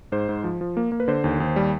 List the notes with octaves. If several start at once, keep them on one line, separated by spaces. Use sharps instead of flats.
G#2 C5
G#2
F3
F3
A#3
A#3
B4
D3 C5
D#2
D#2
G3